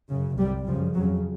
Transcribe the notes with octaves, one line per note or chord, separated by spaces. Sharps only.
F#2 C#3
C2 C3 G3
F#2 C#3 F3
F2 C#3 F#3